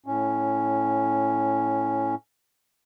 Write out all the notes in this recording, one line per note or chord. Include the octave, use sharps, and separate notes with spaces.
A2 C#4